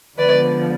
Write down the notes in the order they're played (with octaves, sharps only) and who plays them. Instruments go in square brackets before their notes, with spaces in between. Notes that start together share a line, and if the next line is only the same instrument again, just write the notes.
[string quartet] D3 F3 G#3 B3 B4 D5